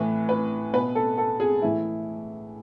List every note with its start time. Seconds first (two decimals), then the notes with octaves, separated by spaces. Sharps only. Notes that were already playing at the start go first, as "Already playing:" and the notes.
Already playing: A2 E3 B4
0.29 B4
0.73 B2 B4
0.95 A4
1.18 A4
1.40 G#4
1.62 A2 E3 E4